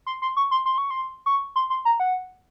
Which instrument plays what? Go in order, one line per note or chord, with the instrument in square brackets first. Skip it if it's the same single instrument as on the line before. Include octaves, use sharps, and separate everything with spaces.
[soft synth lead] C6
C6
C#6
C6
C6
C#6
C6
C#6
C6
C6
A#5
F#5